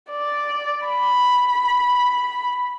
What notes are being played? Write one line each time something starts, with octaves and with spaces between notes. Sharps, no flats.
D5
B5